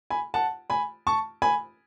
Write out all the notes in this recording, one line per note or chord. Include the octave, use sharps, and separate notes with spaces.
G#5 B5
F#5 A5
G#5 B5
A5 C#6
G#5 B5